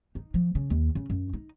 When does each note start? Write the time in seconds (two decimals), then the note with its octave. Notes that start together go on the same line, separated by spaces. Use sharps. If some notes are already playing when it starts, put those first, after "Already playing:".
0.15 D#4
0.34 F3
0.55 C#3
0.70 D#2
0.95 C#3
1.10 F#2
1.33 D#4